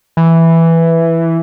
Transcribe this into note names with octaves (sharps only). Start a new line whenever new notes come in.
E3